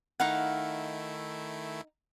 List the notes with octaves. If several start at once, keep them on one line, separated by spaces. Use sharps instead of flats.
D#3 A3 D#4 E4 F5 F#5